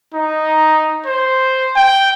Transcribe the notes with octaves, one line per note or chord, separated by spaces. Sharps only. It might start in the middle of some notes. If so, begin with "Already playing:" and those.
D#4
C5
G5